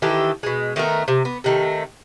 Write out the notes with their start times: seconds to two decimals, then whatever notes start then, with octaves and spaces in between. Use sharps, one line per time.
0.02 D#3 E3 G4 A4
0.43 B2 G#3
0.76 D#3 A3 B3 A#4
1.08 C3
1.25 B3
1.44 C3 D#3 A3